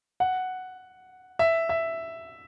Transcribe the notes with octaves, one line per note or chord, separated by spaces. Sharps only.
F#5
E5
E5